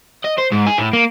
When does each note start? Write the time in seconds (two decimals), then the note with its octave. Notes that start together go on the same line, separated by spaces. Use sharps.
0.24 D#5
0.38 C5
0.52 G#2
0.66 G#4
0.78 A2
0.93 A#3